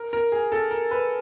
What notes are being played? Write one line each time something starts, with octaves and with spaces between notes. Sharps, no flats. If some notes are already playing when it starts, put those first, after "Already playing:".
Already playing: A#4
A#4
G#4
A4
A#4
B4